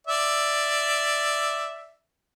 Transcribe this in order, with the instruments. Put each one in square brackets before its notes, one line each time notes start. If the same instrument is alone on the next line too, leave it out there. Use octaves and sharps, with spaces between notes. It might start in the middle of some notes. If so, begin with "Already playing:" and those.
[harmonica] D5 E5